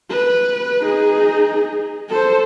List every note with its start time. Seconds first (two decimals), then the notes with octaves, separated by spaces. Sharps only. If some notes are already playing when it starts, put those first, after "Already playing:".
0.10 B4
0.82 D#4 G#4
2.10 A4 C5